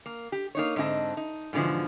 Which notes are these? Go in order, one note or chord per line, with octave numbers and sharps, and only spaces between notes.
A#3
G4
A#3 D#4 C#5
G#2 D3 C4 E4 D#5 A5
D#4
G#2 B2 D3 E3 F3